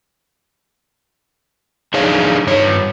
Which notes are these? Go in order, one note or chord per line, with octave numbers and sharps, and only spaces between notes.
D4 D#4 G#4 C#5 F5
G2 C#5